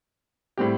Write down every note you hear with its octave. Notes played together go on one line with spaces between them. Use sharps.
A2 G3 C4 G4